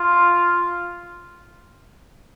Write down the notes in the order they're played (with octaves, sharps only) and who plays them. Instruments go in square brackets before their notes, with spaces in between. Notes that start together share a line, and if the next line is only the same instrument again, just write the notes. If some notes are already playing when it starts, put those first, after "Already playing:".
Already playing: [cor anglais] F4